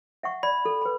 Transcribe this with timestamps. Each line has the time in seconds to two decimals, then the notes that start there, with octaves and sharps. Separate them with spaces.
0.23 E5 F#5 C#6
0.43 D5 B5
0.65 A4
0.81 B4 B5